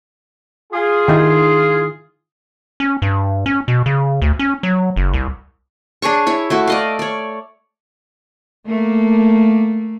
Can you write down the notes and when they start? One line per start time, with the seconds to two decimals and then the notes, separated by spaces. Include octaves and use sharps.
0.73 F4 G#4
1.08 D#3 D#4 E4
2.80 C#4
3.02 G2
3.46 C#4
3.68 B2
3.86 C#3
4.22 D2
4.39 C#4
4.63 F#3
4.96 F#1
5.14 C2
6.02 D4 G#4 C#5 C#6
6.27 E4 C#5
6.50 A3 E4 F#4
6.67 D5 D#5 F5
6.99 C#5 D5
8.66 A3 A#3